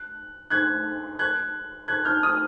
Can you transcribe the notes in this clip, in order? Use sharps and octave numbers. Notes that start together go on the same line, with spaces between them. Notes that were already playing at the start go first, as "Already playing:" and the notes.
Already playing: F#6
F#6 G#6
F#6 G#6
F#6 G#6
F6 G6
D#6 F6